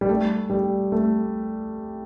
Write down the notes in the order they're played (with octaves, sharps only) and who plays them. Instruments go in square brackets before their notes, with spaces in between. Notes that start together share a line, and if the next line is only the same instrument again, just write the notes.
[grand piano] G3
A3
G3
A3